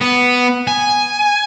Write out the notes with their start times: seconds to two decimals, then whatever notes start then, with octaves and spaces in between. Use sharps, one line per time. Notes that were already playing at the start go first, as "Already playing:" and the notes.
0.01 B3
0.67 G#5